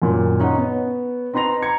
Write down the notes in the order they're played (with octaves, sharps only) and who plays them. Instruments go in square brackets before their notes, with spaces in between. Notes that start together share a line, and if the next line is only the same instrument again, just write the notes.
[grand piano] F#2 A#2 D#3
C#4 D#4 D#5 F#5
B3 C#5
C4 D#4 B4 C6 A#6 F7
A#5 G#6 C#7